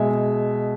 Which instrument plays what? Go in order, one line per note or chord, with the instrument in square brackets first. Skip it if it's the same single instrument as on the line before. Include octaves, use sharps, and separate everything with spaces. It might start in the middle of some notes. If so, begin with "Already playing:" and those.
Already playing: [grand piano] B2 G#3 E5